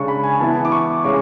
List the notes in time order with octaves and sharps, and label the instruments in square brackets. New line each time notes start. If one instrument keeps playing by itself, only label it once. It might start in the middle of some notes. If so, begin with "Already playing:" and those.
Already playing: [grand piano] C#3 G#3 D4 C#6
B5
G#5
E3 B3 E4 A5
D6
C#6
C#3 G#3 C#4 D6